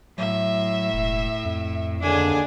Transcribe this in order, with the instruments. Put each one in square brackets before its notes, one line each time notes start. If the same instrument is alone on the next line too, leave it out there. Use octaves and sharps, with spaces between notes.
[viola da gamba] A2 [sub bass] F#3 [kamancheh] E5
[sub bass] E1
F2
[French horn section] D#2 D3 [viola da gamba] D4 [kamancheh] G#4 G#5